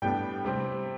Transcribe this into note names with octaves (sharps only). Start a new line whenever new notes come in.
A2 G3 B3 D4 G5
C3 G3 C4